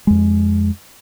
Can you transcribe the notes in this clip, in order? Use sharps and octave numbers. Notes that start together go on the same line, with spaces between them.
F2 G#3